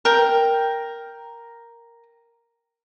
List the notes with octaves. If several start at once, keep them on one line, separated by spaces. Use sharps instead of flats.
A#4 G5